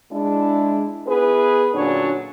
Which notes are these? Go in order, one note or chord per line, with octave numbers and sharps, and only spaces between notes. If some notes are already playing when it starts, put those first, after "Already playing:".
G#3 D4 E4
B3 E4 G#4 B4
A#2 D3 F#3 C#4 D4 C#5